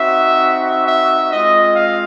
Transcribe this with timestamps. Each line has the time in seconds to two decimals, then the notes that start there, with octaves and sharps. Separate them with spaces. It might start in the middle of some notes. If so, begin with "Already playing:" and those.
Already playing: C4 D#4 F#4 E5
0.86 E5
1.31 G#3 C4 F4 D#5
1.74 F5